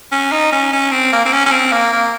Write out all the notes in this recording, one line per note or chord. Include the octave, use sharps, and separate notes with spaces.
C#4
D#4
C#4
C#4
C4
A#3
C4
C#4
C#4
C4
A#3
A#3